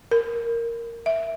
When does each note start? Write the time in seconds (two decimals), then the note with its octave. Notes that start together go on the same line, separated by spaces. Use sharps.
0.11 A#4
1.06 E5